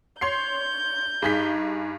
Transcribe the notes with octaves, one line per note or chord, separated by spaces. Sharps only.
C#5 C6 G6 C7
G2 D#4 G#4 B6